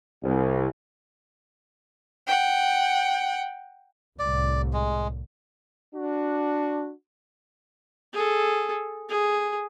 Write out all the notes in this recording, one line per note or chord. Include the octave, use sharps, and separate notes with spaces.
C2
F#5 G5
C2 A2 D5
G#3
D4 F#4
G#4 A4
G#4